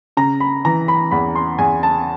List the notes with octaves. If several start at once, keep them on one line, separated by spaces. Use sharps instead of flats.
C#3 A#5
B5
E3 A#5
B5
E2 B5
C6
E2 G#5
A5